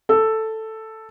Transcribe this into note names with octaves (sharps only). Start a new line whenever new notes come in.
A4